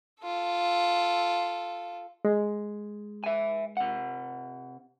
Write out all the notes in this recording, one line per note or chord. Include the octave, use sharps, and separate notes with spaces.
F4 A4
G#3
E5 G#5
C3 F#5